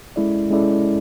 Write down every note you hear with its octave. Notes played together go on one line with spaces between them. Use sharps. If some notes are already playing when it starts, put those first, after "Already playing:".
G#3 C#4 E4 A4 D5
G#3 C#4 E4 A4 D5